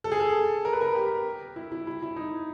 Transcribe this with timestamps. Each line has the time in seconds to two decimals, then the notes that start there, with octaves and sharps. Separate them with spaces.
0.04 A4
0.12 G#4
0.20 A4
0.65 A#4
0.73 B4
0.81 A#4
0.95 G4
1.56 E4
1.72 E4
1.87 E4
2.02 E4
2.16 D#4